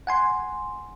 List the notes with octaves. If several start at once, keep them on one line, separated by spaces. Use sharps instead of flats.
F#5 G#5 C6